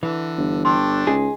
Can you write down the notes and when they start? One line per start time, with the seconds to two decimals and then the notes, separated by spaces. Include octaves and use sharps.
0.03 D3 E3
0.38 G1
0.65 A3 D4 G5 C6
1.07 C#2 D#4 G#4